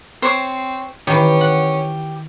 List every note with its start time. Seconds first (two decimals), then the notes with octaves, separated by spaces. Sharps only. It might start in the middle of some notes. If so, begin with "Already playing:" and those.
0.22 C4 C5 C#5 D6
1.07 D#3 E3 C#4 G4
1.41 F#5